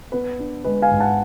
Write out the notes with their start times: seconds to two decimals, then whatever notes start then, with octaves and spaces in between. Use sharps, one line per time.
0.12 B3 B4
0.39 D4
0.64 G#3 B4
0.82 F5 G#5
0.91 G#2
1.00 F#5 A5